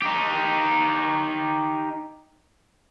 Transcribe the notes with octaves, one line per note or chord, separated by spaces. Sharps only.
D#4 G4